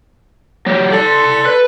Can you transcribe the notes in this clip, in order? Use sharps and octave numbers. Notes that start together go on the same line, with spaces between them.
F#3 G4
A4 D5 C6
B4